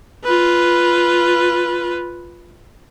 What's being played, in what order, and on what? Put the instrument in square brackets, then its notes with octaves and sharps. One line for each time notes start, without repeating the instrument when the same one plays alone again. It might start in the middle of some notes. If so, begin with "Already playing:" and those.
[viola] F4 B4